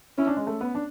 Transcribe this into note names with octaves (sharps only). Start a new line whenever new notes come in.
C#4 E4
D4
G#3
A3
B3
D4